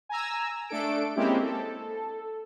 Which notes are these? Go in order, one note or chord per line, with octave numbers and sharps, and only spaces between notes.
G#5 A#5 E6
A3 D4 A4 D7
G#3 A#3 C4 C#4 E4 G4
A4